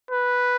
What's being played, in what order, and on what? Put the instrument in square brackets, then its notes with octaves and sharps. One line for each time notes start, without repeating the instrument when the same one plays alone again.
[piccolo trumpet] B4